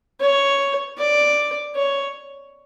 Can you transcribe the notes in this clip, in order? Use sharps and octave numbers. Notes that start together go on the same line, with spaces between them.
C#5
D5
C#5